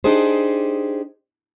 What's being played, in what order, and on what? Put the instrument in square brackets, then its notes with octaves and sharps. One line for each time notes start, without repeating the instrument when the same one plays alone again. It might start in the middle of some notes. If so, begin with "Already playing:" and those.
[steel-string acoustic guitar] D4 D#4 G4 G#4 C5